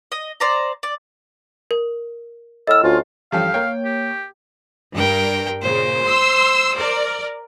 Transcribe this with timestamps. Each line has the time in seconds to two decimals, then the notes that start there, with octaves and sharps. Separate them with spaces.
0.12 D#5
0.40 C5 D5 A#5
0.83 D5
1.71 A#4
2.67 A2 D#5 E6 F6
2.84 D2 C#4 F4
3.32 G2 E3 F3 C#4 G4 A4 F5
3.54 A#3 C#5 G5
3.85 G4
4.95 G2 A#4 G5
5.62 A#2 C#3 C5
6.04 C6 E6
6.77 A#4 D5